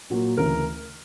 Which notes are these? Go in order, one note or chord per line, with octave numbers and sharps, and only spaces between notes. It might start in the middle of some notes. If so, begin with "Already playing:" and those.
A#2 F#3 A#3
D2 C#3 E3 A#4